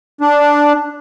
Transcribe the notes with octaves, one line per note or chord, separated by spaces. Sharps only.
D4